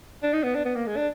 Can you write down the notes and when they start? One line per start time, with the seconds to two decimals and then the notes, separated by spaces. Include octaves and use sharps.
0.23 D4
0.33 D#4
0.43 B3
0.55 D4
0.65 B3
0.76 A#3
0.87 G#3
0.97 D4